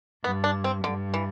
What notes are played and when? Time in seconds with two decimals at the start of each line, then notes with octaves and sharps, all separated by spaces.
0.24 G2 B3
0.44 D4
0.64 C4
0.84 G2 D3
1.14 E3